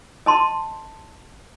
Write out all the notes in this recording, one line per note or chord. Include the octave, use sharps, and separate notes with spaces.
D#5 A5 C6